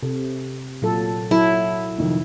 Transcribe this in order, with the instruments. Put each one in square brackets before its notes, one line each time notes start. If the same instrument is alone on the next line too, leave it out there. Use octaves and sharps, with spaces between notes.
[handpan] C3 [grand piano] A4
[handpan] A#2 F#3 A4 [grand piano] F4
[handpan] F#3 A4 [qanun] E4
[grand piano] F1 F2 D#3